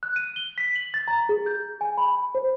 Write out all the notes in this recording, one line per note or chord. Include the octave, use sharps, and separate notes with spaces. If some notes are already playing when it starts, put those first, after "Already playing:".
F#6
D#7
G7
B6
F#7
A6
A#5
G#4
G6
G#5
B5
C5